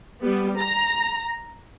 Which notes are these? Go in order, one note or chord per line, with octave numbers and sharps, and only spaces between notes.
G3 B3
A#5